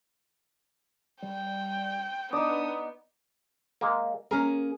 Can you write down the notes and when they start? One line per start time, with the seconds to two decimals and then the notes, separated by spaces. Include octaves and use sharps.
1.22 G3 G5
2.33 B3 D4 D#4 D5 D#6
3.81 G#3 A#3
4.31 A#3 C#4 G#4 A#4